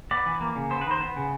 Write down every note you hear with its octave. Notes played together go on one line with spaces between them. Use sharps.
B3 D5
E3
A#3
C#3
B3 C5
B4
D#3 C5
B3
C#3